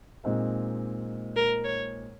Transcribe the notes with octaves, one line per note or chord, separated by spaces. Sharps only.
A#2 G#3 C4 D#4
A#4
C#5